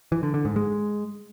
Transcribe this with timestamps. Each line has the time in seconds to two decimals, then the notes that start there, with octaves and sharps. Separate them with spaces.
0.12 E3
0.23 D3
0.34 D3
0.45 G#2
0.56 G#3